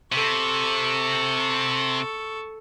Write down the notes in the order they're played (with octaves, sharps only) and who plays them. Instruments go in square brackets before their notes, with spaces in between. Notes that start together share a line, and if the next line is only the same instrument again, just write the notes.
[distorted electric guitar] C3 [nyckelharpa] A4 C#6